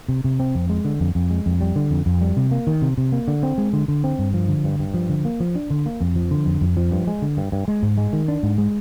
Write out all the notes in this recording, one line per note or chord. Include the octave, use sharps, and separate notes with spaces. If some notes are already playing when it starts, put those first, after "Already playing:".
C3
C3
C4
F2
G#3
D3
F2
F2
G#3
F2
G3
D3
F2
F2
G3
C3
A#3
D#3
C3
C3
A#3
D3
C4
G#3
D3
D3
C4
G2
F3
D3
G2
G2
F3
D3
A#3
F3
D4
D3
A#3
F2
F3
D3
F2
F2
F3
G2
G#3
D3
G2
G2
G#3
G#2
G#3
D#3
D4
G#2
G#3